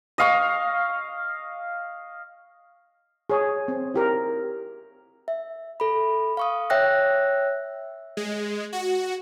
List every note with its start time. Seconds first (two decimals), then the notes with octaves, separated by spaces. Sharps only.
0.18 D#5 F5 C#6
3.30 G#4 C#5 G#5
3.68 C4
3.94 E4 G4 A#4
5.28 E5
5.80 A4 B5
6.37 F5 C#6 D#6
6.70 C#5 E5 G5 E6 F#6 A#6
8.17 G#3
8.73 F#4